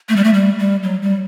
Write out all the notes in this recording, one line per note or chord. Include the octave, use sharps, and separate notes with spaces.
A3
G3
A3
G3
G3
F#3
G3